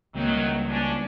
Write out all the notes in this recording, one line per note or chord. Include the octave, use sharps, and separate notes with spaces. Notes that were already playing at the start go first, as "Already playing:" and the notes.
C#2 D#3 F#3 G3 A#3
C#4 D4